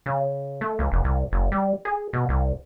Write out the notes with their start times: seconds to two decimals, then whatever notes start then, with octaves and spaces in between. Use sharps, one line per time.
0.06 C#3
0.61 A3
0.79 C#2
0.92 F1
1.04 C2
1.32 F#1
1.52 G3
1.85 G#4
2.13 B2
2.29 C2